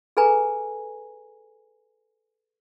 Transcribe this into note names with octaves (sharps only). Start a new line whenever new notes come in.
G#4 A4 B4 G#5 A#5